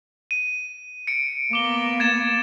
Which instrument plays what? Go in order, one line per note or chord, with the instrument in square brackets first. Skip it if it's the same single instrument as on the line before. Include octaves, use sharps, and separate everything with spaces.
[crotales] D#7
C#7 D7
[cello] A#3 B3 [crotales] D6 G7
[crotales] G#6 A6 E7